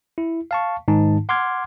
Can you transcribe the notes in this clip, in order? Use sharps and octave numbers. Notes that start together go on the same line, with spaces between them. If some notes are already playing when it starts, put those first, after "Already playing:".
E4
F5 A5 C#6
G#2 D#3 D#4 A5
F#5 C6 D6 F6 G#6